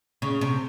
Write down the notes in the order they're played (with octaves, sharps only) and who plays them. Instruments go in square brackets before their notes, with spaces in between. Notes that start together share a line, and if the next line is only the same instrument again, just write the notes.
[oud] C#3
C3